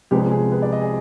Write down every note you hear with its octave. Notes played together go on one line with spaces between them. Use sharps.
C2 C3 F3 G#3 B3 G4
G#4
B4
D5
D#5
G#4